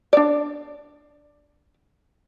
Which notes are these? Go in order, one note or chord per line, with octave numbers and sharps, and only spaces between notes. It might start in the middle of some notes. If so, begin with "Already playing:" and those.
D4 D5